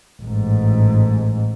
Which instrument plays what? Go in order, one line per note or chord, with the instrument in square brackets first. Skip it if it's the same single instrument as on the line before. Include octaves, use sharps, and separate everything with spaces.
[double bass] A1 G#2